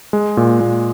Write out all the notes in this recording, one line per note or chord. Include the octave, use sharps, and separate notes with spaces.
G#3
A#2
A#2